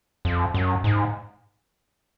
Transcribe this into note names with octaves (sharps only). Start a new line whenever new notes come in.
F2
F#2
G#2